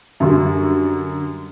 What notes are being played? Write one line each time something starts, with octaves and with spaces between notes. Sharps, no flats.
F#2 D3 G3